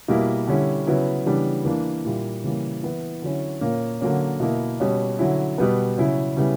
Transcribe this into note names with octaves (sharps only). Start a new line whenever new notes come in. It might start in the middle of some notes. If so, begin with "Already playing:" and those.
B2 G3 A#3 E4
D3 G3 C#4 E4
C#3 F#3 B3 E4
C#3 E3 G3 B3 D4
E3 A#3 D4
A#2 G3 A#3 E4
C#3 E3 G3 A#3
E3 B3 E4
D3 F#3 C#4 E4
A#2 A#3 C#4
D3 F#3 A#3 C#4
B2 A#3 E4
B2 G3 C#4
D3 F#3 C#4 E4
B2 G3 B3
C#3 F#3 C#4 E4
C#3 G3 B3 E4